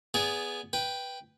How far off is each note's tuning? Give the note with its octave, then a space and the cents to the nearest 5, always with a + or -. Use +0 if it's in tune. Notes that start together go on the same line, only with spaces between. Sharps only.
B3 +0 G#4 +0 D5 -25
B4 +0 G5 +0